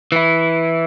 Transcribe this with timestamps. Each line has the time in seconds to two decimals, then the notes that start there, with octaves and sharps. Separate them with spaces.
0.12 E3 E4